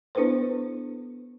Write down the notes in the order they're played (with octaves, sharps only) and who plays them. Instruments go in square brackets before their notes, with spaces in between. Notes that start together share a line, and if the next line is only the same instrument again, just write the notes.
[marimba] B3 D4 E4 A4 B4 C5